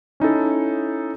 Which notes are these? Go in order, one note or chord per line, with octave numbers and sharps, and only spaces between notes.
C#4 D#4 E4 A4